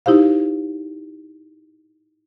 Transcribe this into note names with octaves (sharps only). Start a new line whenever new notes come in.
D#4 E4 G4 C5 F5